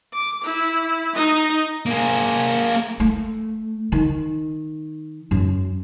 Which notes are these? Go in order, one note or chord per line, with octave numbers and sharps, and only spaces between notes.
D6
E4
D#4 D#5
A#3 G#4
A3
D#3
F#2